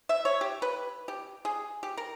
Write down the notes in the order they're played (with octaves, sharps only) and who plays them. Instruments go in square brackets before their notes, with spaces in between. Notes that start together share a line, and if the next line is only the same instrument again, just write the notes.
[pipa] E5
C#5
G4
B4
G4
G#4
G4
A#4